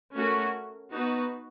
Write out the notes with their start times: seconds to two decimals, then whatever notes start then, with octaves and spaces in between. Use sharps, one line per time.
0.14 A3 C#4 F#4 A#4
0.91 B3 D#4 F#4 B4